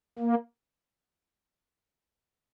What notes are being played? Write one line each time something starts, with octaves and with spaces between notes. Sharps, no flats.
A#3